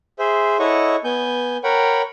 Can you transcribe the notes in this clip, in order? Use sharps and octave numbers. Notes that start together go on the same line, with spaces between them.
G#4 C5 E5
E4 A4 C#5 D#5 F#5 C#6
B3 G#5 G6
A#4 C#5 F#5 G5 B5